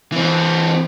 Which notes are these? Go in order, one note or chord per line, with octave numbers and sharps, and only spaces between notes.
E3 C4